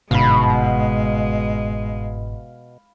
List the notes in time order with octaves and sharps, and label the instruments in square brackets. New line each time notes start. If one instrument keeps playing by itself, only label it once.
[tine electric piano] G1 G#2 [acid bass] B2 [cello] G#3 [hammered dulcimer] F5 B5